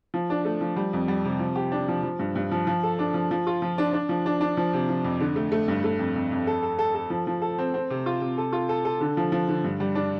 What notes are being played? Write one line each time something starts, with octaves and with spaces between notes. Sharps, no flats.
F3
D4
A3
F3
G3
F2
G3
C3
F3
G4
D4
F3
F3
G2
G2
F3
F3
A4
D4
F3
F3
F4
F3
D4
D4
F3
D4
D4
F3
C3
F3
F2
D3
A3
A3
G2
A3
F2
F2
F2
A4
A4
A4
A4
F3
F3
A4
C4
C4
C3
F4
C3
A4
F4
A4
A4
D3
F3
F3
D3
G2
G3
D4